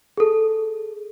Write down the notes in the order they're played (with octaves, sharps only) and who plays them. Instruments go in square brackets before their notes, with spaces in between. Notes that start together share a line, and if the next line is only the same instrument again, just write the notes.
[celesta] G#4 A4